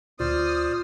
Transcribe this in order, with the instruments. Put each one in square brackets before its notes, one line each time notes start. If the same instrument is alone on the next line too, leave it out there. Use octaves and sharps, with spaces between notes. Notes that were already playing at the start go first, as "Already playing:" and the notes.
[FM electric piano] D2 A#2 [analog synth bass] F4 [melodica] C5 D5 [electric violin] D#6 F6